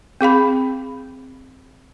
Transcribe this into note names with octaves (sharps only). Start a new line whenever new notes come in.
C4 G#4 F5 B5